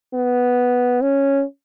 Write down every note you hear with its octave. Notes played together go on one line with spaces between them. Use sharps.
B3
C#4